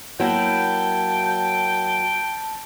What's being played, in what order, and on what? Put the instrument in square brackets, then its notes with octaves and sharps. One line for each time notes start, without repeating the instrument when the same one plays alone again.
[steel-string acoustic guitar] F#3 A#3 E4 [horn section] G5 [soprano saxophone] A5